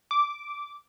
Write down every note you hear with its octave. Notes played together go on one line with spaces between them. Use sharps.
D6